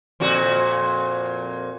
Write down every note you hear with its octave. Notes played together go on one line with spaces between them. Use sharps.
F2 A#2 F#4